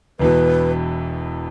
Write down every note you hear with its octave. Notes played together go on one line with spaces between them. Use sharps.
E1 E2 B2 B4